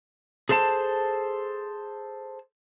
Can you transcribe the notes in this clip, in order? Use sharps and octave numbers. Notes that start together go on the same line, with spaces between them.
G#4 A4 C5 E5 A5